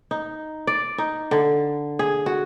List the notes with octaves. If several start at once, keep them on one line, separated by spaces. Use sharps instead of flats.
D#4
D5
D#4
D3
G#4
F#4